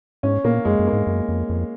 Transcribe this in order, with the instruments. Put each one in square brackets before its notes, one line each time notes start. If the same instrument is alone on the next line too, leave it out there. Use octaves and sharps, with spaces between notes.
[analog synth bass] G#2 [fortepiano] C#4
[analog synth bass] A#2 [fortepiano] A#3
[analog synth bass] F#2 [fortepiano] G#3
[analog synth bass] F#2
[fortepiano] A#3
[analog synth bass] G#2
F#2
F2
F2